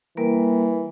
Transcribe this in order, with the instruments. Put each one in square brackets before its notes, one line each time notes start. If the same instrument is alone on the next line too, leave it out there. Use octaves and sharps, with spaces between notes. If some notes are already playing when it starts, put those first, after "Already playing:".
[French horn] E3 [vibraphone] G3 A#3 A#4